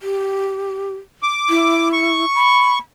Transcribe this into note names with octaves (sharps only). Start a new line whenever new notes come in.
G4
D6
E4
C#6
B5